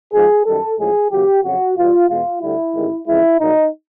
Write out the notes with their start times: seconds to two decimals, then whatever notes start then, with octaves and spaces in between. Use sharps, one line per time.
0.12 G#1 G#2 F3 G#3 G#4
0.45 F#2 D#3 G3 A4
0.78 A1 A2 F3 G#3 G#4
1.10 D#2 C#3 F#3 G4
1.43 F2 C#3 F#3 F#4
1.76 E2 B2 G3 F4
2.08 E2 B2 G#3 F4
2.41 D2 D3 G3 E4
2.74 A1 G#2 D#3 G#3
3.06 F2 C#3 E3 G#3 E4
3.39 A#1 A#2 F#3 D#4